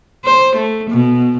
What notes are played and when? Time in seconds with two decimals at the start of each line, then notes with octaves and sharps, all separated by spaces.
0.25 C5
0.55 A3
0.90 B2